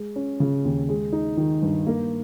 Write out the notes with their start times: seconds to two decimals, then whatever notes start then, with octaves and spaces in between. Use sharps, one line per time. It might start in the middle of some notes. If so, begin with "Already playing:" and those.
Already playing: G#3
0.16 C#4
0.40 C#3
0.65 D#2
0.89 G#3
1.12 D#4
1.37 D#3
1.62 G2
1.87 A#3